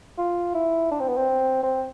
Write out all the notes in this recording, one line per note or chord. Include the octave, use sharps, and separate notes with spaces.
F4
E4
D4
C4
B3
C4
C4